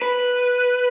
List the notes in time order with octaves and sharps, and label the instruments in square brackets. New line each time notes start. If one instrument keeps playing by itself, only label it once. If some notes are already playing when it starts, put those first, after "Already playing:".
[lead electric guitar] B4